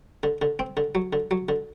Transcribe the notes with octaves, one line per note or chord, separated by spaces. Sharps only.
D3
D3
C4
D3
F#3
D3
F#3
D3